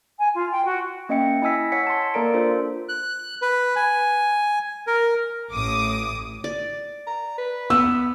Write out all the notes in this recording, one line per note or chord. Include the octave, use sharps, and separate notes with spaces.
G#5
F4
G5
F#4
A#3 C#4 D#5 E5 G5 C#7
E4 D#5 G#5 E6 B6
C#5 F#5 E6 B6 C#7
A5 C6
A#3 A4 A#4 D5 A#5 D7
D4 F4 A4 C5
F#6
B4
G#5
A#4
A1 A2 D6 D#6
D5
A#5
B4
B3 E6